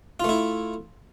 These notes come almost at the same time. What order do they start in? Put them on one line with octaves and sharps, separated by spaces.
F4 A3 E4